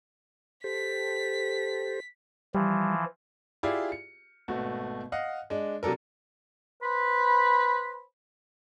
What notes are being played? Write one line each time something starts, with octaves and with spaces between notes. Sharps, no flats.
G4 A4 C5 B6
E3 F3 G3
E4 F4 G4 G#4 D5 F5
C#7
G#1 B2 A3 F#4
D#5 F5 F#5
G#3 D4
C3 F#3 D4 A4 A#4
B4 C5 B5